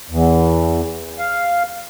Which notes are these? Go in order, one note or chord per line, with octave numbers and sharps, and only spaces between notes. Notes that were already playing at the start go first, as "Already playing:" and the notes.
E2
F5